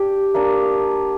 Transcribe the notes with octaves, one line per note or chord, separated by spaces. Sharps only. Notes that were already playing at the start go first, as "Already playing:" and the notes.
Already playing: D4 G4
A#3 D4